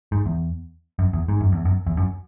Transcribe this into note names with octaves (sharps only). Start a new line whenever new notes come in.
G#2
E2
F#2
E2
G#2
F#2
E2
F#2
E2
F#2